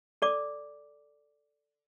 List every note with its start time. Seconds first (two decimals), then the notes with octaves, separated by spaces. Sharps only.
0.22 A4 D5 D6